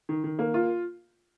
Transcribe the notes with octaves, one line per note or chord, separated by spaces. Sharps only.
D#3
D#3
A#3
F4